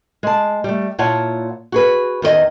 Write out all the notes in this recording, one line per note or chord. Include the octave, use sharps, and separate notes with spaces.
G#3 A5
G3 A3
A#2 E4 F4 C#5 F#5 A5
F#4 G#4 B4
E2 D#3 B4 D#5